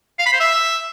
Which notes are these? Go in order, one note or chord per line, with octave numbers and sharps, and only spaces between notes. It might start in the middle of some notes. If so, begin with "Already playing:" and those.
F5
B5
C5
E5